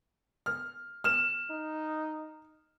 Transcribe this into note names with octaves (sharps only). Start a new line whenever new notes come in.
F6
F6 E7
D#4